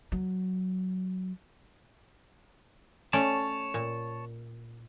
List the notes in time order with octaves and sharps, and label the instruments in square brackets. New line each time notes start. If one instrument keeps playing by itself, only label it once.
[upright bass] F#3
[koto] A3 C#4 D5 [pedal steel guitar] C#5 A5
[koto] A#2